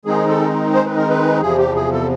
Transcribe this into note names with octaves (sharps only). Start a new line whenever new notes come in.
D#3 G#3 C4 D#4 G#4
A4
C5
B4
A#4
B4
E2 C3 F3 G#4
G4
G#4
A4